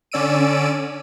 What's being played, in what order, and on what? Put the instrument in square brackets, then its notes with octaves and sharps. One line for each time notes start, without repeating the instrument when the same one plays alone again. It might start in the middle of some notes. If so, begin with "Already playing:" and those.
[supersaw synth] D3 C#4 D5 E6 D7 D#7